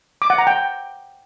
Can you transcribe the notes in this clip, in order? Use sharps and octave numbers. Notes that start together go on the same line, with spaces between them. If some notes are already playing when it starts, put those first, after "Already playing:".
D6
F#5
A#5
G5